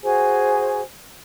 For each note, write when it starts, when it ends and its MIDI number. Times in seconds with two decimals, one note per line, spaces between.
0.03 0.81 66
0.03 0.81 68
0.03 0.81 72
0.03 0.81 80